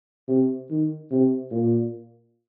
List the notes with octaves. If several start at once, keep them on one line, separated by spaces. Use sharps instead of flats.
C3
D#3
C3
A#2